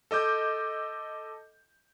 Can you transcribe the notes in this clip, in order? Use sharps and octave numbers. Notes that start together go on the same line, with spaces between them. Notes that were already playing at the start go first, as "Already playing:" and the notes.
A4 D#5 D6 G6